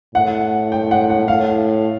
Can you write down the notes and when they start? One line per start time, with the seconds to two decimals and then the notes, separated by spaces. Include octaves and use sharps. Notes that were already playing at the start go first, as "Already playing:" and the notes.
0.15 A2 F#5
0.72 G5
0.91 F#5
1.10 F#5
1.28 A2 F5